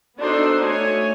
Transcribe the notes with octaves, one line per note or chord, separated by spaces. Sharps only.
B3 D4 D#4 F#4 A4 C5
A3 C#5 G#5